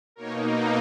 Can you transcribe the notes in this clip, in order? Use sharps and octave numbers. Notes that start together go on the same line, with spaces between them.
B2 A#3 D#4 A#4 C#5